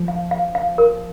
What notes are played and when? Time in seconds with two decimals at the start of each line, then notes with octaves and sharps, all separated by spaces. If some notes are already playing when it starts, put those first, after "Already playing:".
Already playing: F3
0.08 F5
0.31 F5
0.55 F5
0.78 A#4